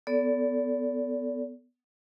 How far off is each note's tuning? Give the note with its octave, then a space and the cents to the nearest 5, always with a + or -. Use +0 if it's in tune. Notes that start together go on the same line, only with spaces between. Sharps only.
B3 +15 A4 +0 D5 -35